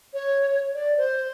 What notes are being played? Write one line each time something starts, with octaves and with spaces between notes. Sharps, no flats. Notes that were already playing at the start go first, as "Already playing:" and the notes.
C#5
D5
C5